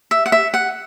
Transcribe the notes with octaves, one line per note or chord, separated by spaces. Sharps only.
E5
F#5
E5
F#5